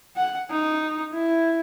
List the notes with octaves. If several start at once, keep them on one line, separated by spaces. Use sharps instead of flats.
F#5
D#4
E4